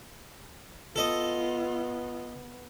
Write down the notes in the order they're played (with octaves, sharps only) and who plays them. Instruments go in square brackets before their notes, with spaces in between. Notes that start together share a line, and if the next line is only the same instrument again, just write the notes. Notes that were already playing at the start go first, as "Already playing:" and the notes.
[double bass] B3 [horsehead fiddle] F4 [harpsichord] A4 D#5